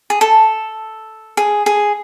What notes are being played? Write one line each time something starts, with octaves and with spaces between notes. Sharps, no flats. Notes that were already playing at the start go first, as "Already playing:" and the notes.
G#4
A4
G#4
G#4